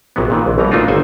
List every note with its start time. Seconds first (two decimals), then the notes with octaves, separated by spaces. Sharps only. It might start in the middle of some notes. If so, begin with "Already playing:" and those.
0.16 A#1 C3 F#3 B3
0.30 A#2 D#3 E3
0.46 A#1
0.58 A#1 B2 E3 G3 A#5
0.71 A#2 A3 D4 D#4 F4 F#4
0.88 G1 D#3 C5 F#5 G#5